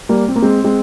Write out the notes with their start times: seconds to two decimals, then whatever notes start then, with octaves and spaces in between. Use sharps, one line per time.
0.09 G3 A#3
0.28 C4
0.36 A#3
0.42 G#3 C4
0.64 G#3 C4